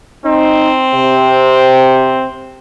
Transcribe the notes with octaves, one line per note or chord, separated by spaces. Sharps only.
C4 D#4
C3